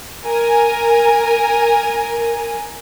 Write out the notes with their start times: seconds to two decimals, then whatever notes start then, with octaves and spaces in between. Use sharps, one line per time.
0.26 A#4 G#5